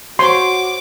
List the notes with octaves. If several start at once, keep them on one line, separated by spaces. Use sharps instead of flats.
F#4 C5 C#5 C6 D6